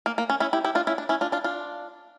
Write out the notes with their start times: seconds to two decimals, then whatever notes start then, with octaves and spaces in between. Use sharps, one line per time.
0.06 A#3
0.18 A#3
0.30 C#4
0.40 C#4 E4
0.53 E4 G4
0.64 E4 G4
0.75 D4 F4
0.87 C#4 E4
0.98 D4
1.09 C#4 E4
1.21 D4 F4
1.32 D4 F4
1.44 D4 F4